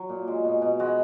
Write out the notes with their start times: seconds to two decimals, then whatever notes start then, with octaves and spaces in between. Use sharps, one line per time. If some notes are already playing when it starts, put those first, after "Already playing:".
Already playing: F#3
0.09 A#2
0.28 G#3
0.45 B2
0.62 B2
0.80 G#3 F#4